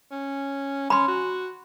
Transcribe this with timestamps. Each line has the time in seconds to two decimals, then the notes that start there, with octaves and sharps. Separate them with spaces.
0.11 C#4
0.90 C#4 B5 C6
1.08 F#4